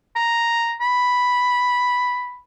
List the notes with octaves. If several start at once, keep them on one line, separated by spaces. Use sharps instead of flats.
A#5
B5